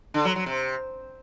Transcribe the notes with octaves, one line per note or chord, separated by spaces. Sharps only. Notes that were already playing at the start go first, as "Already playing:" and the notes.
D3
F#3
F#3
C3